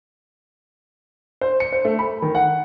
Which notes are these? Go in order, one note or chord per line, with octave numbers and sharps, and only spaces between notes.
C5
C#7
C5
A3
B5
D#3
F#5